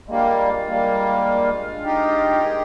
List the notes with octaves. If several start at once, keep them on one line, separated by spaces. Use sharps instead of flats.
G3 G#3 A#3 D4 F4
G3 A#3
D#4 G4
A#2 G#3 D4 G#4